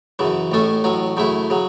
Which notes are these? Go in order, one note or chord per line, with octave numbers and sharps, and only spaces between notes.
F#2 C#3 E3
A1 A2 A3 C#4 A4
A1 A2 F#3 C#4
F#2 C#3 A3 E4
C#3 F#3